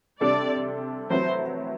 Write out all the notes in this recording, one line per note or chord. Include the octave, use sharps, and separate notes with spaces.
C3 G3 D4 A4 D5
F#3 A3 C4 E4 B4 C5